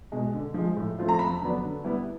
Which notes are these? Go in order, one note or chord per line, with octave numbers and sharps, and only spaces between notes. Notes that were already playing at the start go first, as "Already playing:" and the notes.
B2 G#3
D3
F3 G#3
A2
F3 A3 C4 F4
A#5
F2 B5
D3 F#3 B3 D4
D3
G3 B3 E4